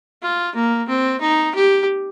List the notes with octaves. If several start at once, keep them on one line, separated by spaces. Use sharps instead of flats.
F4
A#3
C4
D#4
G4